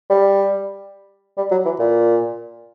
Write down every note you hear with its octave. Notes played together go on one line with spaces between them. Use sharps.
G3
G3
F#3
E3
A#2